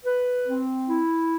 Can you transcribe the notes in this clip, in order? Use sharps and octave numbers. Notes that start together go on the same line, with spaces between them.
B4
C4
E4